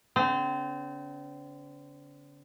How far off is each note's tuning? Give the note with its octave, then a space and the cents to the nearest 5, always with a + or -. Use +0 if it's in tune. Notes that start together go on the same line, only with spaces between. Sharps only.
D3 -45 C4 -30